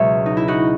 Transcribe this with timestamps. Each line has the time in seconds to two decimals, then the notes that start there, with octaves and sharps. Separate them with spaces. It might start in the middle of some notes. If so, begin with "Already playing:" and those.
Already playing: C#2 B2 F#3 C#5 E5
0.26 D#4
0.37 E4
0.48 D#4 F#4